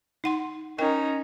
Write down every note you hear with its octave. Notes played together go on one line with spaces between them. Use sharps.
D#4 F#5 C6
C#4 D#4 A#4 D#5 G5